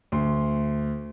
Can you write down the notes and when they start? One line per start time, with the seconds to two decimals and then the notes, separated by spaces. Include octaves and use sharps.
0.12 D2 C6